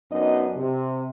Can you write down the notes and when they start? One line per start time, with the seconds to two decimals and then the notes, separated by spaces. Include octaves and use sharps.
0.11 F#2 B3 D4 D#4 D#5
0.56 C3